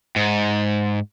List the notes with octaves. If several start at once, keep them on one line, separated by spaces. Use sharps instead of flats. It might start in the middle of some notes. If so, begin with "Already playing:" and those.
G#2